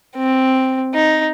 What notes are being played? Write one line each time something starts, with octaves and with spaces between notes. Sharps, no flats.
C4
D#4